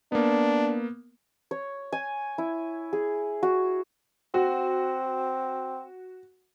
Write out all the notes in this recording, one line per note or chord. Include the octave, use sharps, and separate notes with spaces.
A#3 B3 D4
C#5
G#5
E4
G#4
F#4
C4 F#4